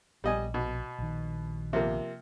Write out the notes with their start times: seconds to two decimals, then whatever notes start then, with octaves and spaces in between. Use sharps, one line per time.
0.24 A#1 G3 D#5 G#5
0.54 B2
0.99 A#1 D#3
1.73 C3 F3 A#3